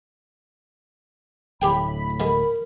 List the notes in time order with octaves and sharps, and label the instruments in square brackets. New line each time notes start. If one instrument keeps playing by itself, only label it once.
[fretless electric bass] D1 A2 [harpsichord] G4 G#4 G5 [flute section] B5
[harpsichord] D3 G#3 [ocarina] A#4